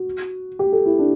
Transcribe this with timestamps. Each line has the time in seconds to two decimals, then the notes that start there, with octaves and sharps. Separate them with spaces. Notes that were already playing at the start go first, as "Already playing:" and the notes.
Already playing: F#4
0.59 G4
0.72 A4
0.86 E4
0.99 D4